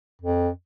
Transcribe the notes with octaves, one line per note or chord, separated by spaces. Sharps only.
F2